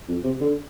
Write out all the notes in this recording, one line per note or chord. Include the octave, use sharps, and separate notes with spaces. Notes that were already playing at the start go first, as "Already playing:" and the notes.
F2
C3
D3